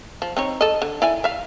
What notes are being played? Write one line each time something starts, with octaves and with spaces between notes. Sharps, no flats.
F3
C4 D#4 C#5
A4 D#5
D3
E4 D5 G#5
E5 F5